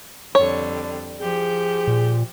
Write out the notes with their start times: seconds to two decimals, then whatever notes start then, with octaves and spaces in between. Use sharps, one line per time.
0.35 F2 D3 G3 C#5
1.21 F3 G4 G#4 G6
1.88 A#2